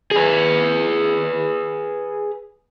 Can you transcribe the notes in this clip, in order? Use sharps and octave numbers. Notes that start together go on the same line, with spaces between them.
G#4 B4